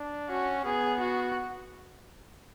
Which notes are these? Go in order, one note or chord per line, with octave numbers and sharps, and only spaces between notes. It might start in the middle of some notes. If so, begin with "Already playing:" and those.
Already playing: D4
C#4 F#4
B3 G#4
F#4